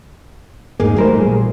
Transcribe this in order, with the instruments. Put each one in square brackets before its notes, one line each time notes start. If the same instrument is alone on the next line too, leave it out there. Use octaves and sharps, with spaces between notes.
[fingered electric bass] E2 G#2 A#3 [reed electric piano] D#4 G#4
[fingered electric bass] A1 G3 A3 [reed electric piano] F#3 A#4 C5
[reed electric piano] A#2 G#4